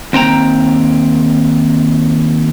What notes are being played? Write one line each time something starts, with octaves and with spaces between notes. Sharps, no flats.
D#2 C4 G5 A#5